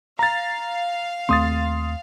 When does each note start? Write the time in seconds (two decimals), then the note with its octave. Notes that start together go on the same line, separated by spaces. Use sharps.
0.19 F5 A#5 A6
1.29 D#2 A3 C4 C6 D#6 A6